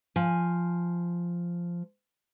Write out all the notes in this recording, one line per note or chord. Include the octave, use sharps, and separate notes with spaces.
F3 G#5